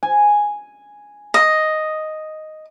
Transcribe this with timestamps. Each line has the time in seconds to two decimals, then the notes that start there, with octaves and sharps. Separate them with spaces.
0.03 G#5
1.34 D#5